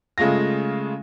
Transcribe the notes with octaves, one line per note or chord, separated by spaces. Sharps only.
C#3 G#3 A3 F4 A#6